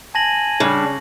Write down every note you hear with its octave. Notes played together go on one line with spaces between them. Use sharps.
G#5 A5 A#6 F#7
C#3 G3 D4